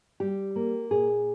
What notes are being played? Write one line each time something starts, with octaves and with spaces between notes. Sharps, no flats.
G3 G4
A#3
A#2 G#4